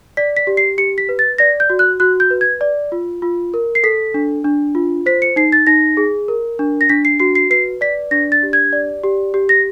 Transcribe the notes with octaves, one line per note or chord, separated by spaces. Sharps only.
D5 B6
B6
G4
C7
G4 C#7
B6
B4
A6
D5 A#6
G6
F#4
F#6
F#4 F#6
G6
B4
G#6
D5
F4
F4
A#4
C7
A4 B6
D4
D4
F4
C5 B6
C#7
D#4 C7
A6
D#4 A#6
G#4
A#4
D4
A#6
D4 B6
C7
F#4 C7
C7
B4 C7
D5 B6
D4 A#6
A6
G4
G#6
D5
G4
G4
A#6